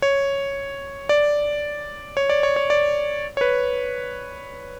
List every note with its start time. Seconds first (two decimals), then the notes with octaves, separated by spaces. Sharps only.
0.02 C#5
1.09 D5
2.17 C#5
2.29 D5
2.43 C#5
2.56 C#5
2.70 D5
3.37 C#5
3.41 B4